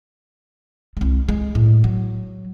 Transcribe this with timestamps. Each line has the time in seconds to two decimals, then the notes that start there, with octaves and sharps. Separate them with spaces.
0.97 C2 G#3
1.29 G#3
1.55 A2
1.84 F#3